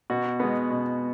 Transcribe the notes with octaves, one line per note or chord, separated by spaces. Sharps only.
B2 F#4
G#3 B3
B2